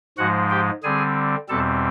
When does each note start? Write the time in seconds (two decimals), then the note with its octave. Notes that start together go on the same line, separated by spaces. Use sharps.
0.18 G#2 F3 G#3 F#4 F#5
0.50 G4 G5
0.83 D3 G3 C4 G#4 G#5
1.49 E2 B2 G3 C4 A4 A5